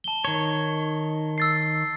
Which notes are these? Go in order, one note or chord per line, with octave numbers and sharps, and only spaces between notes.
A5 G7
D#3 C#5
E6 A6 C7